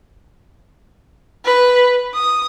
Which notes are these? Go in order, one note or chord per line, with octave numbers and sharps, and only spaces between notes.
B4
D#6